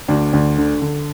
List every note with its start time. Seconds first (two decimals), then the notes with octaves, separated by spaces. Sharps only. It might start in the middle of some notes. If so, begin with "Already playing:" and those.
0.08 D2 D4
0.33 D2
0.58 D3
0.82 D3